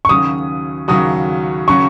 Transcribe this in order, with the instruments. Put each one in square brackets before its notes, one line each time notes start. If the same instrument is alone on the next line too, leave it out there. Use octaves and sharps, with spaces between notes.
[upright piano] C#6
[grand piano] D#2 C#3 F#3 C#4 F#4 [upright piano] D#6
[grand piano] D#2 C#3 F#3 C#4 F#4 [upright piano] D#6
[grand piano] C#3 F#3 C#4 F#4 [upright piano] C#6